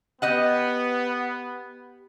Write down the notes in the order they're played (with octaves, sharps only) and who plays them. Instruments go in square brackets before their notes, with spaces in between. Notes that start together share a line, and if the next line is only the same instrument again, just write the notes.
[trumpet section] B3 [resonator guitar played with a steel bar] G4 D#5 F#5